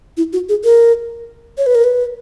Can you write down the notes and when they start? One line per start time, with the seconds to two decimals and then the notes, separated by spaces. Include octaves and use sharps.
0.17 E4
0.33 F#4
0.49 G#4
0.64 A#4
1.58 C#5
1.66 B4
1.75 A#4
1.84 B4